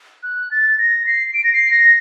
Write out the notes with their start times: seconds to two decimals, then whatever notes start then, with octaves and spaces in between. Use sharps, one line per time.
0.23 F#6
0.51 A6
0.78 A#6
1.06 C7
1.34 D7
1.44 A#6
1.53 C7
1.71 A#6